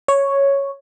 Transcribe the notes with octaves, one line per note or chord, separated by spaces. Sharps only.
C#5